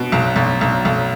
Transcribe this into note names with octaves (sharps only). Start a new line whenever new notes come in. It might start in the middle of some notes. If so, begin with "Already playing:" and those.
Already playing: B2
B1
B1
B1
B1